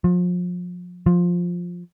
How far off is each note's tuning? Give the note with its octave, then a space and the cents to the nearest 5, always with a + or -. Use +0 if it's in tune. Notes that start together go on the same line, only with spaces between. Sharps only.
F3 +35
F3 +10